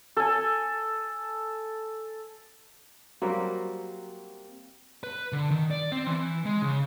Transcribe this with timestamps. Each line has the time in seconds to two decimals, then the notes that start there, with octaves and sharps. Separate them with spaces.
0.17 A4 G#5
3.22 F#3 G3 A#3 C4
5.04 B4
5.32 D3
5.51 D#3
5.71 D5
5.92 C4
6.07 E3
6.46 G#3
6.62 C#3